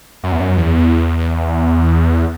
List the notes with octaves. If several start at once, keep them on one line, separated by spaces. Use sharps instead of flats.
F#2
E2
F#2
E2